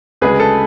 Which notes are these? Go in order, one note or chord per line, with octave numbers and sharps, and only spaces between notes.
D2 C#3 G#3 G#4 B4
A4